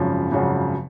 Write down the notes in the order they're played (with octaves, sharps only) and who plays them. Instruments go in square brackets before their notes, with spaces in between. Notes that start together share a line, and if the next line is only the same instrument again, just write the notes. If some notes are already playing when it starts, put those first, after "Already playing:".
Already playing: [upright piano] G#1 F#2 C#3 F3
G#1 F#2 C#3 F3